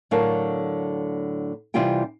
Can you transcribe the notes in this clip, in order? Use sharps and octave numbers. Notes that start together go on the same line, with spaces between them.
A2 D3 F#3 A#4 F5 A5
C3 E3 G3 F4 G4 G5